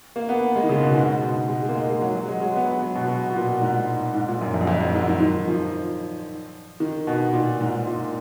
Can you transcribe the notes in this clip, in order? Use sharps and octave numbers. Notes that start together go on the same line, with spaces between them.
A#3
B3
G#3
D#3
C#3
B2
G#2
B2
G#3
A#3
G#3
F#3
F#3
G#3
F#3
B3
B3
F#3
B2
B2
B2
A#2
G#2
G#2
A#2
F#2
F2
F#2
F2
F#2
G#2
D#3
D#3
F3
D#3
B2
A#2
G#2
A#2